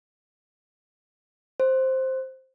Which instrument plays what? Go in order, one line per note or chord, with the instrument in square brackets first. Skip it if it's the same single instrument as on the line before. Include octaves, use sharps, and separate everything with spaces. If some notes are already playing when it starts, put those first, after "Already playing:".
[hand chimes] C5